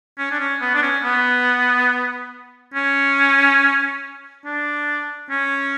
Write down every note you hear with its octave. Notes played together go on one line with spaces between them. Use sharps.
C#4
D4
C#4
B3
D4
C#4
B3
C#4
D4
C#4